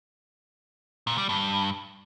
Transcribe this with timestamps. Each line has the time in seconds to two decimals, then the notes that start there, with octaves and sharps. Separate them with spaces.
1.07 A#2
1.18 G3
1.29 G2